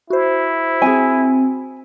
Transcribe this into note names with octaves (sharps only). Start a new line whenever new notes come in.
E4 F#4 C5
C4 G#4 G#5